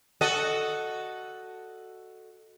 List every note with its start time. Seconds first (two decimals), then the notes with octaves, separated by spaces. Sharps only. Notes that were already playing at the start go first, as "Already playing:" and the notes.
0.21 F#4 A4 D#5